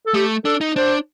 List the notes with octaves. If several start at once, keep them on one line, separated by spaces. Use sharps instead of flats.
A4
A3 G4
D4 A4
D#4
D4 C5